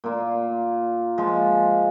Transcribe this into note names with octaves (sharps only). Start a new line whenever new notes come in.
A#2 A#3 F4
F3 G#3 F4